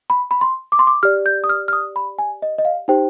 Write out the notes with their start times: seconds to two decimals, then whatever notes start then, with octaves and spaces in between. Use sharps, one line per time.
0.10 B5
0.31 B5
0.41 C6
0.72 D6
0.79 C6
0.87 D6
1.03 G4 D5 F6
1.26 G6
1.44 D#6
1.49 F6
1.68 F6
1.73 D#6
1.96 B5
2.19 G#5
2.42 D#5
2.58 D#5
2.65 F5
2.88 D#4 G4 C5 G5